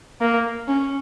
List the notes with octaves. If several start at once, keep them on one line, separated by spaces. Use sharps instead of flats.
A#3
C#4